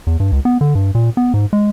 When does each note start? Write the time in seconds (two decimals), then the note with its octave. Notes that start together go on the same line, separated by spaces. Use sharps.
0.07 E2
0.20 G2
0.32 C#2
0.45 B3
0.61 D3
0.75 G2
0.95 A#2
1.17 B3
1.34 G#2
1.53 G#3